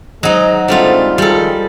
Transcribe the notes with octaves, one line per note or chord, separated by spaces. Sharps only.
F#3 G#3 D#4 C5 D#5
G#2 D3 G3 A3 C4 F4
D#3 F3 G3 G#3 A4